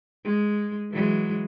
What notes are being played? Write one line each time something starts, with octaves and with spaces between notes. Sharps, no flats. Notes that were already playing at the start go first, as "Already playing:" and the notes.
G#3
E3 F#3 G#3